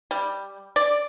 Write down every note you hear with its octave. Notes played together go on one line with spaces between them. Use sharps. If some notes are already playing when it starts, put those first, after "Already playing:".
G3
D5